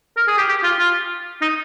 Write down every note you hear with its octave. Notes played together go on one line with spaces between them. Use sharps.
A#4
G#4
G4
G4
F4
F4
D#4